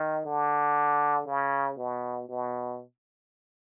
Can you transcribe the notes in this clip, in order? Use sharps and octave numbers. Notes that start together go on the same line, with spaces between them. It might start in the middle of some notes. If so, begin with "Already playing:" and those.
Already playing: D#3
D3
C#3
B2
B2